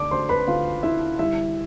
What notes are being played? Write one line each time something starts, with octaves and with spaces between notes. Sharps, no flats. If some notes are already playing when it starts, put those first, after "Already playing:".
Already playing: D2 D5 D6
D2 C5 C6
B4 B5
D2 F4 F5
D2 E4 E5
G3 E4 E5